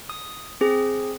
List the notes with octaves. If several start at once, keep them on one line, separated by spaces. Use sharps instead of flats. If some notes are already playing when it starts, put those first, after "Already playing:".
D#6
C4 G#4